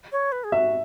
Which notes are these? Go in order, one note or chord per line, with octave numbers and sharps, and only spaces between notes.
C#5
B4
G#4
F#4 E5